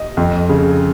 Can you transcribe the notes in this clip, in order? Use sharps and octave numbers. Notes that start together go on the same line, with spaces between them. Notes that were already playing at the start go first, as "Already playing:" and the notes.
Already playing: D#5
F2
C#3